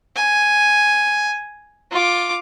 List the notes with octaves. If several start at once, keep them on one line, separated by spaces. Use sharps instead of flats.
G#5
F4 D6